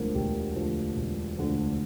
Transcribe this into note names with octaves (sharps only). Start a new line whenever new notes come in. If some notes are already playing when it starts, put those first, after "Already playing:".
Already playing: E1 D2 D3 F3 A#4 C5
E1 G4
D2 D3 F3
E1
D2 D3 F3